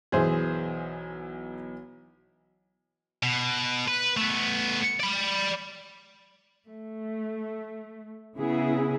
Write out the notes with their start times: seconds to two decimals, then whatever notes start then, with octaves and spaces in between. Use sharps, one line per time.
0.12 B1 E3 G#4 C5 E5
3.23 B2
3.88 B4
4.17 A3 B3
5.00 D5 B5
6.67 A3
8.37 C#3 B3 E4 G#4